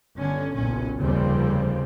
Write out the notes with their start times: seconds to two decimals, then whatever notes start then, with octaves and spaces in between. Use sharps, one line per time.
0.16 G1 D3 C#4
0.55 F#1 B1 A#2 C#4
0.98 F1 D#2 C#3 F3 G3 C4